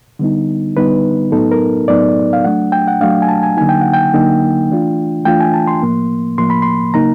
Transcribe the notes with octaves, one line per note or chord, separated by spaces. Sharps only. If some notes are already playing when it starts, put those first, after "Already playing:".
D3 G3 B3 D#4
D3 G3 B3 D#4 B4
A2 F#3 B3 D#4 A4
A#4
A2 F#3 B3 D#4 D5
F5
F#3 A3 D4 F#5
G5
F#5
F#3 A3 D4 F5
G#5
A5
G#5
D3 F#3 A#3 D#4 G#5
G5
F#5
G5
D3 F#3 A#3 D#4
E3 A3 D4 F4
E3 A3 D4 F4 G5
G#5
A5
C6
A2 F3 A#3
A2 F3 A#3 C6
B5
C6
C#3 F#3 A#3 D#4 A#5